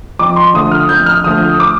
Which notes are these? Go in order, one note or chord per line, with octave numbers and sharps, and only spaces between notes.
F2 D6
C6
D3 F3 A3 D#6
F6
F2 G6
F6
D3 F3 A3 D#6
D6